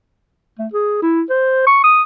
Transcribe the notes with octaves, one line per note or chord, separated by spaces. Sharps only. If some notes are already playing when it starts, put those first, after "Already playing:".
A3
G#4
E4
C5
C#6
D#6